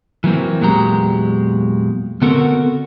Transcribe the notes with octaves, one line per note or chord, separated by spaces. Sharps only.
E3 F#3 A#3 C4
E2 A#2 F#3 G#3 G4 A#5
D3 B3 C4 F#4 A4 A#4